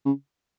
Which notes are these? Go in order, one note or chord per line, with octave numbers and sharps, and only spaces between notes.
C#3